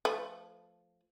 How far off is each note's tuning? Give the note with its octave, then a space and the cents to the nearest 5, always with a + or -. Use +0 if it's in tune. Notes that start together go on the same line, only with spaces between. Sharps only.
F3 +0 A3 +0 B4 +25